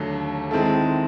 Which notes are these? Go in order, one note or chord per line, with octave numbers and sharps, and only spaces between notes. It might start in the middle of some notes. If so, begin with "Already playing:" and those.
Already playing: D#2 D3 F#3 A3
D#3 G#3 C4 E4 A4